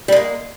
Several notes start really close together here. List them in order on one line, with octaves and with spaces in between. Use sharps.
G3 G#3 A#3